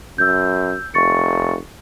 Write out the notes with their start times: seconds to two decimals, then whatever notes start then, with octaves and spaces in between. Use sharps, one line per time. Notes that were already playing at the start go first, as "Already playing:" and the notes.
0.18 F#2 E6 G6
0.94 F1 C#6 A6 C#7